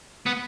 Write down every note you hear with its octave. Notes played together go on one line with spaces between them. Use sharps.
B3